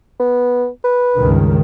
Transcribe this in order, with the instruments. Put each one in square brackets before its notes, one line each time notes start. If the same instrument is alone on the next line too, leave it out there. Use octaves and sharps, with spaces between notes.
[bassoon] B3
B4
[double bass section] C#2 G2 D#3